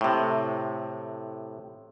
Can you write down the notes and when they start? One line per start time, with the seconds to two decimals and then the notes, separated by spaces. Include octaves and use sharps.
0.01 A2 C3